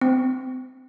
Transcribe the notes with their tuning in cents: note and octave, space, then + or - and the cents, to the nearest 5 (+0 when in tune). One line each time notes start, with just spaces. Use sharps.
C4 -25